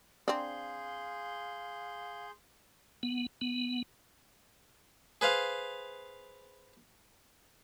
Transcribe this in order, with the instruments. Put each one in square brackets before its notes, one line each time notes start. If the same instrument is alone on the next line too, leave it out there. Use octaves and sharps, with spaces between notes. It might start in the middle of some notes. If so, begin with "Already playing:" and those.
[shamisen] C4 D4 [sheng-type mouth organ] G#4 C6 G6 [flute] F5
[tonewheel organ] B3
B3
[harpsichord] G#4 B4 C5 F5